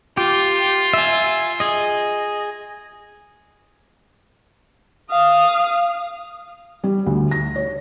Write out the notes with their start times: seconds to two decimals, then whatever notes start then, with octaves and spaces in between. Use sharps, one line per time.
0.17 F4 G4
0.93 E5 G#5
1.60 G#4 D#5
5.11 F5 D#6
6.84 G3
7.06 D2
7.31 A#6
7.56 C#5